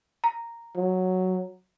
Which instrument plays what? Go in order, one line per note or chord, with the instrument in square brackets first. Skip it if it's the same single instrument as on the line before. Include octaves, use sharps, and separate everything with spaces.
[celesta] A#5
[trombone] F#3